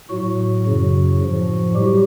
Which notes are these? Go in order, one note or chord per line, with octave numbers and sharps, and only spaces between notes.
A2 F#3 F#4
F#2 C#3 F#3
A2 F3
F#3 G3 G4